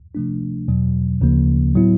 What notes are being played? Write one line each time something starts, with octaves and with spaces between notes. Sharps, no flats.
C3 F3 A3 D4
E2 B2 F#3
D2 C#3 F3 A#3
A2 F#3 B3 E4